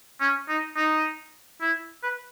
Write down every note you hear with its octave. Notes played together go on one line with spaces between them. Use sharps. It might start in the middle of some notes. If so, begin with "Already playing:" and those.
C#4
D#4
D#4
E4
B4